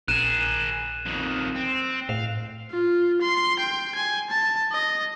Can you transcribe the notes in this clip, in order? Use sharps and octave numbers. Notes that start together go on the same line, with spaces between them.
A#1 G#4 A#4 F#6 D#7 E7
F2 D#3
C4
A2 F5
F4
C6
G5
G#5
A5
D#5